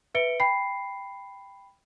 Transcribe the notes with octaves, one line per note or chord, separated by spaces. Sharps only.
B4 E5 C#7 D7 G7
G5 B5 C7